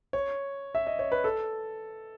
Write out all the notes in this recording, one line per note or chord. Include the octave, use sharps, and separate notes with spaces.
C#5
E5
D#5
C#5
B4
A4